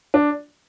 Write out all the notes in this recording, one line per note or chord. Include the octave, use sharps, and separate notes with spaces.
D4